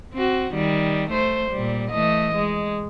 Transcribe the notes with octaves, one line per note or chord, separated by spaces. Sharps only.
C4 F#4
D#3 G3
A3 C5
A#2 G3
E3 A3 D#5
G#3